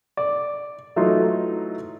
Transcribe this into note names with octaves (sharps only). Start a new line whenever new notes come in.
D5
E3 F#3 A3 D#4 F4